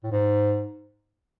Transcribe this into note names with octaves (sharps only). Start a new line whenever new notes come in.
A2
G#2